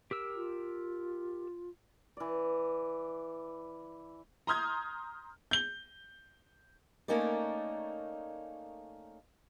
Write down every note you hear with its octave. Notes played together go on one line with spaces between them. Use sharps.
G4 A#4 E6
F4
E3 D5
A#5 C6 D#6 F6 G6 G#6
G6 G7
A3 A#3 C#4 D#4 A#4 D5